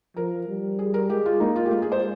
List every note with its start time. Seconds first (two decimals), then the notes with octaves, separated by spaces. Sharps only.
0.16 F3 A#4
0.48 G3
0.79 G#4
0.94 A#4
1.09 G#3 G4
1.25 F4
1.40 A#3 D#4
1.56 F4
1.65 G4
1.71 G#3 F4
1.82 G#4
1.92 C5